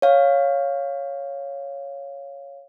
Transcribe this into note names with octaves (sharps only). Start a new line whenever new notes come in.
C#5 F5